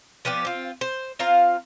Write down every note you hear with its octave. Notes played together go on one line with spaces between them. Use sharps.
F3 B3 G4 D5
C4 F4
C5
C4 F4 F5 A#5